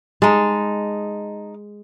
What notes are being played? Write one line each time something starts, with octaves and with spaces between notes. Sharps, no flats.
G#3 D#4 A5